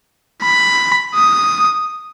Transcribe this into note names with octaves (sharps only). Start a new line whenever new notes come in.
B5
D#6